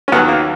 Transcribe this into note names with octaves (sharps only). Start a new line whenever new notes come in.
C#4
D#2 D#3 F#3 B3
A#3